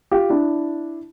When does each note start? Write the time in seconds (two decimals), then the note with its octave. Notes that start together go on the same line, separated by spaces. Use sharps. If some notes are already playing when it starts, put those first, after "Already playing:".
0.11 F4 G4
0.30 D4 E4